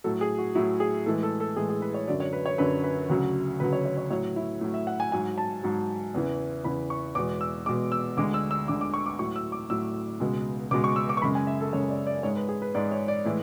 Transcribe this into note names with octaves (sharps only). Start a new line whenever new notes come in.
A2 F#3 A4
G#4
F#4
A2 F#3 E4
G#4
A2 E3 G#3 A4
A4
A4
A2 E3 G#3 G#4
G#4
B4
C#5
F#2 D3 F#3 D5
C#5
B4
C#5
F#2 D3 F#3 B4
B4
D2 C#3 F#3
D2 C#3 F#3 B4
C#5
C#5
C#5
A2 F#3 C#5
E4
A2 F#3
E5
F#5
G#5
G#2 F#3 G#5
A5
G#2 F#3
E2 C#3 E3
E2 C#3 E3 B5
C#6
E2 B2 G#3 D6
E6
E2 B2 G#3 D6
E6
D2 D3 G#3 D6
E6
E6
D2 D3 G#3 D6
D6
C#6
D6
A2 F#3 C#6
E6
D6
A2 F#3 E6
C#2 B2 G#3
C#2 B2 G#3 D6
C#6
E6
D6
C#6
F#2 C#3 G#3 B5
G#5
E5
A4
F#2 C#3 G#3 C#5
D5
D5
G#2 G#3 C#5
B4
G#4
B4
G#2 G#3 D5
C#5
D5
A2 E3 G#3